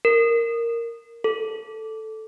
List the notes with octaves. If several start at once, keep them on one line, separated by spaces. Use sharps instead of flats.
A#4
A4